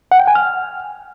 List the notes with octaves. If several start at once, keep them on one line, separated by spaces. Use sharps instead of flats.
F#5
G5
G#5
F6